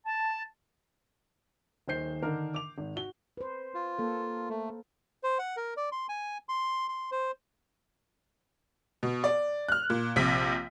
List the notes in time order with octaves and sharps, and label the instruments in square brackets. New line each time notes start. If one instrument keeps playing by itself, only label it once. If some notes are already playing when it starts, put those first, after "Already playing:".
[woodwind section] A5
[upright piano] D#1 D#3 C5 G6 C7
D3 D#3 D4 A#4
D6 F7
G#1
F#4 G7
[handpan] B4 C5
[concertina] F4
[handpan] A#3 A4
[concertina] A3
C5
F#5
A#4
D5
C6
G#5
C6
C6
C5
[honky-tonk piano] B2
D5
F6 F#6
A#2
A#1 C3 B6